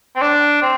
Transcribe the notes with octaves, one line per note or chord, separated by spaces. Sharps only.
C4
D4
C4